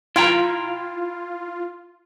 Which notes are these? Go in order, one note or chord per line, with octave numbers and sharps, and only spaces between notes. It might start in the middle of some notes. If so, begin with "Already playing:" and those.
E4 F4 G5 A#5